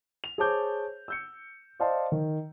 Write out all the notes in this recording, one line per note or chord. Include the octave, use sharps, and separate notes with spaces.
F7
G#4 C5 C#5 A5 D6 G6
E6 G6 C#7
C5 D5 D#5 F5 A5 C6
D#3